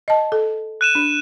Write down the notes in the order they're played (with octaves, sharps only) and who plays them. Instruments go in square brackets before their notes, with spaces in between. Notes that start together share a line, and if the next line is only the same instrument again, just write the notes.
[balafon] D#5 A5
A4
[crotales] F#6 D#7 E7
[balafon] D4